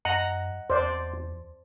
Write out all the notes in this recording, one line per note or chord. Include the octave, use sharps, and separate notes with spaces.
F#2 D#5 F#5 A#5
E2 C5 D5